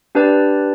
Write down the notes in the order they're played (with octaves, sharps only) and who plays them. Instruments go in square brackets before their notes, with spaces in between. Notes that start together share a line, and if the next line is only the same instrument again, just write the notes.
[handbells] D4 G4 B4 D5 A5